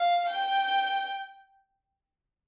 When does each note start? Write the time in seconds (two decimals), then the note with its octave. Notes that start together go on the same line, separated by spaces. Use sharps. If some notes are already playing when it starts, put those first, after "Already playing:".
Already playing: F5
0.29 G5